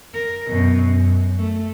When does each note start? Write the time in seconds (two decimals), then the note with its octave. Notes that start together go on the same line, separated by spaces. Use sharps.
0.14 A#4
0.49 F#2 B2
0.93 F#2
1.38 A3